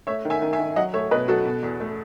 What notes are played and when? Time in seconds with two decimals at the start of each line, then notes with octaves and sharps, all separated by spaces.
0.07 A3 C#5 E5
0.25 D#3
0.30 E5 G#5
0.42 D#3
0.53 E5 G#5
0.59 D#3
0.76 F#3 D#5 F#5
0.94 A3 C#5 E5
1.11 B2 B4 D#5
1.28 F#3 F#4 A4
1.45 B2
1.63 E2
1.80 A3